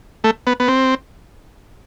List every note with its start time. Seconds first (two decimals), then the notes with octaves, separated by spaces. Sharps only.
0.24 A3
0.47 B3
0.60 B3
0.68 C4